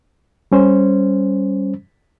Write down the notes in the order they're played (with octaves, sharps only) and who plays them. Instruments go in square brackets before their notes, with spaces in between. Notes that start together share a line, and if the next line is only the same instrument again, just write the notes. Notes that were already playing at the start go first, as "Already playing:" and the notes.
[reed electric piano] G3 C#4 C5